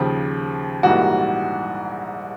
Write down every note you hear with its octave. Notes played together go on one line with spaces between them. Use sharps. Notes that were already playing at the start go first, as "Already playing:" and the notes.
Already playing: D#2 C#3 F3
A#1 G#2 E3 G3 A#3 F#4